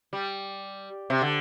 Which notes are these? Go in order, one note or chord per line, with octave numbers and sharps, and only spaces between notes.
G3
C3
D3